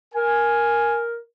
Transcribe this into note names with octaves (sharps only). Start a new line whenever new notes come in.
A#4 G#5